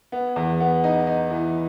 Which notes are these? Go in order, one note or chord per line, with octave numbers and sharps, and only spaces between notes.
B3
E2
B3
D#4
D#4
E3